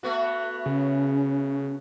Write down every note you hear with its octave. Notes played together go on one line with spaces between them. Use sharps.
A3 B3 F#4
C#3 C#4